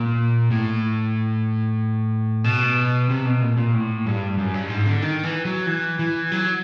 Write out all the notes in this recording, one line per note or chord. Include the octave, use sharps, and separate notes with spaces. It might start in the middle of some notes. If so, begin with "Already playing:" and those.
Already playing: A#2
A2
B2
C3
B2
A#2
A#2
A2
G2
F#2
G2
G#2
D3
D#3
E3
F#3
E3
E3
F#3